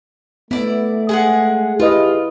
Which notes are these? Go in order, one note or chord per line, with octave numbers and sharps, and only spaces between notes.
A3 B3 E4 D5
G#3 G#4 F#5
E4 F4 G4 G#4 B4 D#5